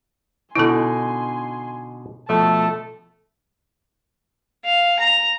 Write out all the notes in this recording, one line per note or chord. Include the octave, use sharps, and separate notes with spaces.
B2 D3 D#4 E4 A4 G#5 C6
B2 F3 A3 A5
F5
A#5